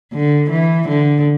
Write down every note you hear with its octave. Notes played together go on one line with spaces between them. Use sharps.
D3
E3
D3